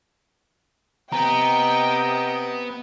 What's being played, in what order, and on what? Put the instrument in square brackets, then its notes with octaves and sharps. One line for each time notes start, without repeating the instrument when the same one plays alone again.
[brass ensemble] C3 D#5 [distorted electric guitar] B3 [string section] G5 [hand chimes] A#5